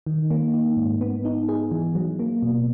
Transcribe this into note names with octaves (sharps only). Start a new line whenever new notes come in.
D#3
A#3
D#4
G#2
B3
D#4
G#4
E3
F#3
A#3
B2